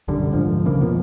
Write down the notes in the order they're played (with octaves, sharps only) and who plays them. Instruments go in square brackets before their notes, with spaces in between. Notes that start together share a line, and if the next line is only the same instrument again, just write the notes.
[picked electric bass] B1 F#2 D3 G3
D1 G#2 D3 F3
B1 C#3 E3 A#3
F2 B2 D#3 F3